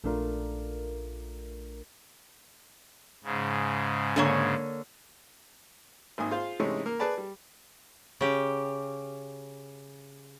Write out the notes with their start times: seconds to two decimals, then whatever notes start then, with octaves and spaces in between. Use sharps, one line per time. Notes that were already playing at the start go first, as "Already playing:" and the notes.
0.04 A#1 A3 D4 F4 A#4
3.24 G#2 C#3
4.16 D3 A#3 C#5
6.18 G#1 D#3 A#3 G#5 D#6
6.31 F4 G#4 C5 F5
6.60 C3 E3 G#3 A3 C#4 D#4
6.86 A#3 A#4
6.99 G#4 B4 D5 A5 B5
7.18 G3
8.21 C#3 G4